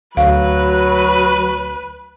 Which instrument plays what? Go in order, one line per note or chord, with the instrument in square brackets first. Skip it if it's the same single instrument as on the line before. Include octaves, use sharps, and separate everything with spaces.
[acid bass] D2 [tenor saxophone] F#3 [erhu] B4 [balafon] F5